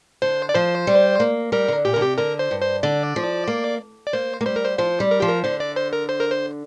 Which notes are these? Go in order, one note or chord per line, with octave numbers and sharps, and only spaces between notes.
D3 C5
D5
F3 C5
G3
A#3
G3 A#4
D3
A#2 G4
D3 A#4
C3 G4
D3 A#4
C5
G2
C5
D3 D5
F3
A#3
D5
A#3 C5
A#3
G3 C5
A#4
C5
F3 C5
G3
A#4
F3 G4
A#4
D3 C5
D5
C5
A#4
C5
A#4
C5